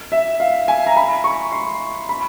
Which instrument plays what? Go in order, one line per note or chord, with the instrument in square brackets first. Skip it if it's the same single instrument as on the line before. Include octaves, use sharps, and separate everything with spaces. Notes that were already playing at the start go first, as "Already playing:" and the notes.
[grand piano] E5
F5
G#5
A#5
B5
C#6
C6
B5